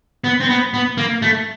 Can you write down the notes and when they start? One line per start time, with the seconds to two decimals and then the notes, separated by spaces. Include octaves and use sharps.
0.24 B3
0.40 C4
0.49 B3
0.74 B3
0.98 A#3
1.22 A3